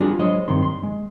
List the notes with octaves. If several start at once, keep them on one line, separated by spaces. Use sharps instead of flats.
G3 D4 F4 F#4 G#4
F#3 G#3 C5 C#5 D#5
G2 C3 D#3 C6
C6
G#3